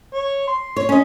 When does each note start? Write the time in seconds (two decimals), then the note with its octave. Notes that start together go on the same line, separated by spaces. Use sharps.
0.14 C#5
0.47 C6
0.76 C#5
0.89 C#4 D#5